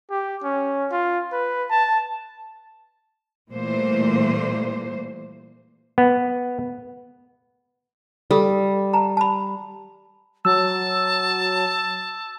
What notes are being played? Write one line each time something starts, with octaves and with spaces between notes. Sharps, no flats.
G4
C#4
F4
B4
A5
A#2 E3 G3 A3 A#3 C5
B3
G3 A4
A5 A#5
A5 B5
F#3 A5 E6